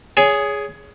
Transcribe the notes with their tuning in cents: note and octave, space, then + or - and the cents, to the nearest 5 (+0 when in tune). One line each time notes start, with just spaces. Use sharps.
G#4 +0 C#5 +25